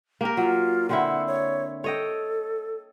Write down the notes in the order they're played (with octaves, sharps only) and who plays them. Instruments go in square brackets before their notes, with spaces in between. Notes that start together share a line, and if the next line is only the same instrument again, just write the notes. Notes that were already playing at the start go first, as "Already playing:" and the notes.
[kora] A#3 G4 A#4
[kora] F#3 [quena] F4
[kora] D3 C4 E4 [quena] F#5
[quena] C#5
[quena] A4 [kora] C#5 D#5 G5